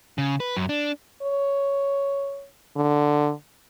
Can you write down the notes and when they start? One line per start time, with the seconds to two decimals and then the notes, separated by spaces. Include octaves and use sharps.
0.18 C#3
0.40 B4
0.57 F#2
0.69 D4
1.22 C#5
2.76 D3